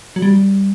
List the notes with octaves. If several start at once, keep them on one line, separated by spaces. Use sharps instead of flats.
F#3
G3